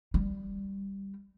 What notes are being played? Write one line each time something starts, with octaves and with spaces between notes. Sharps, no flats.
G3